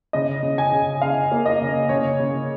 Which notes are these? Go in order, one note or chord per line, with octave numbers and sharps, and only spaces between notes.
C#3 D#5
C#3
G#5
C#3
C#3 F5
A#3
D#5
C#3
C#3 C#5
C#3